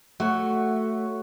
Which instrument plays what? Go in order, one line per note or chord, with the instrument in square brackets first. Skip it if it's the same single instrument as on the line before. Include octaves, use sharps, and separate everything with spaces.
[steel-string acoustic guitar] A3 [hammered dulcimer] F#4 C#5